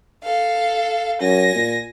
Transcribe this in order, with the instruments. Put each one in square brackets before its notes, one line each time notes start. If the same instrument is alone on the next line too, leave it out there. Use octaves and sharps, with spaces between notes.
[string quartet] A4 F5
[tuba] F#2 [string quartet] G#5 A#6
[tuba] A#2